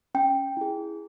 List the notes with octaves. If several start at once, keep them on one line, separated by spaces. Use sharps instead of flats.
C#4 G5
E4 G#4